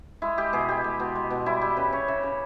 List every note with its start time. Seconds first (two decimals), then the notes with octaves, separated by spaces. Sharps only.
0.22 G#3 E4
0.38 G#3 G4
0.53 B2 G#4
0.68 G#3 G4
0.84 G#3
1.00 B2
1.15 G#3
1.30 B2
1.46 G3 E4
1.61 G3 G4
1.77 C#3 B4
1.92 C#3 C#5
2.08 C#3 E5
2.23 C#3